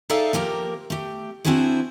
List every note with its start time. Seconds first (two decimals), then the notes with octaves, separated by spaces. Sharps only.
0.10 D#4 G#4 A4 D5 E5 F5
0.33 F3 A#3 G4 A#4
0.90 A3 G4
1.45 C4 D4 E4 F#4 G#4 C5